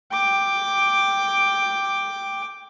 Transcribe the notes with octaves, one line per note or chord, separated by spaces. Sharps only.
G5 D6